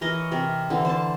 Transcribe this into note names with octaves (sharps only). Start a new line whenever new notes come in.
E3 A#4 C#5 D#5
C3 A#4
D3 E3
C5 A5